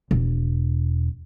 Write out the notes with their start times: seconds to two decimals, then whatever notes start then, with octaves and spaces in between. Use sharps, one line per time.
0.11 E1